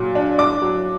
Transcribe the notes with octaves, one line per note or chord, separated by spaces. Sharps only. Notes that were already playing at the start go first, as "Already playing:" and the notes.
Already playing: A#2 F#3
D4
D4 D6
F#3